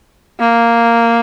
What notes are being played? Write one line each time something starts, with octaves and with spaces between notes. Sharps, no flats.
A#3